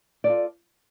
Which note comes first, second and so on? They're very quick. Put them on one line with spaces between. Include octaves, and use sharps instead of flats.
D5 A4 F4